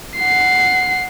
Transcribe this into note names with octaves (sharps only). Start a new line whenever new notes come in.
F#5 C7